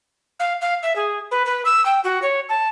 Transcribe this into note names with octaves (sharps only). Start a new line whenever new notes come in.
F5
F5
E5
G#4
B4
B4
E6
G5
F#4
C#5
A5